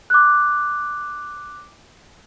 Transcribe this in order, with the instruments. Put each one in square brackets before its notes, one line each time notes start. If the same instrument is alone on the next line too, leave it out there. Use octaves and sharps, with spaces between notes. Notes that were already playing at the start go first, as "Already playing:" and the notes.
[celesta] D6 F#6